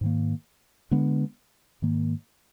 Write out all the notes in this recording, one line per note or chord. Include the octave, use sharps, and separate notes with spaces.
G#2 D#3 A#3
D3 G#3 B3 D4
G#2 D#3 A#3